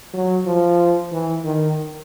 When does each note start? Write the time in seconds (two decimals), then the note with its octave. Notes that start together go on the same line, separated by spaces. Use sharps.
0.14 F#3
0.46 F3
1.12 E3
1.45 D#3